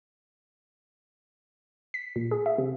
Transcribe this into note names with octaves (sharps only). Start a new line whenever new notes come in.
B6
A#2
G#4
E5
C3